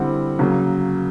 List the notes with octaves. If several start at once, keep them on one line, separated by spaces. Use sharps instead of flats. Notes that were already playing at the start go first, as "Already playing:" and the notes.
Already playing: D3 G3 C4 E4 F#5
C#3 F#3 A#3